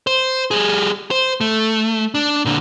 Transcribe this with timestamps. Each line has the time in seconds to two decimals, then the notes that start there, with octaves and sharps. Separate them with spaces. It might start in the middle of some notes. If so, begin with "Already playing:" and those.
0.07 C5
0.51 G3 G#4
1.11 C5
1.41 A3
2.14 D4
2.45 A#2 D3